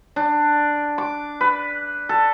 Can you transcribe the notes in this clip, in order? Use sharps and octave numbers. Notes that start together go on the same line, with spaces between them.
D4
D6
B4
A4